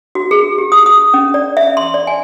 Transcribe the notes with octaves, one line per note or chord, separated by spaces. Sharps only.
F#4
G#4
G4
D#6
D#6
C#4
D5
E5
C6
D5
G#5